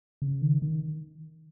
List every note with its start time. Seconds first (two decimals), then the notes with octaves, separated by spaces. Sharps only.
0.22 C#3
0.42 D#3
0.62 D#3